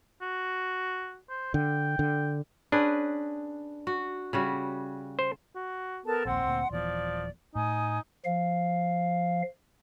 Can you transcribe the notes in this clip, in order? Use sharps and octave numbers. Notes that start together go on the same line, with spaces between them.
F#4
C5
D3 G5
D3
C#4 D4 G#4 B4
F#4
C#3 G3 F#4
C5
F#4
B3 A4 A#4 A5
A#1 D#2 C4 F#5 C6
D2 A#2
D#1 E3 F3 B3 D5
A2 D#4 G#5 D#6
F3 F5